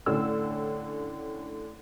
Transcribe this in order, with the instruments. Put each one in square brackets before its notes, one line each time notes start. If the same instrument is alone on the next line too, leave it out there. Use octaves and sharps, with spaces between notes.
[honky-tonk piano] A2 D3 C#4 E6